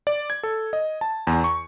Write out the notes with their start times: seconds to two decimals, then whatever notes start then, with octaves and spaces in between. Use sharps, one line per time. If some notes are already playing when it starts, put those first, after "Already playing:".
0.07 D5
0.30 G#6
0.43 A4
0.73 D#5
1.01 A5
1.27 E2
1.44 C#6